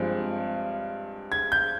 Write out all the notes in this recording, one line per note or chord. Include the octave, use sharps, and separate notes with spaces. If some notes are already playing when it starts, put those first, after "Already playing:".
Already playing: G2 F3 G#3 C4
G#6
G6